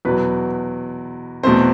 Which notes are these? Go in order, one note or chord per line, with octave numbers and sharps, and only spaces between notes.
E2 B2 F#3 B4
E2 B2 A3 C4 C5